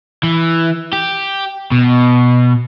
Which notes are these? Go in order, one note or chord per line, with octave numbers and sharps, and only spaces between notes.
E3
G4
B2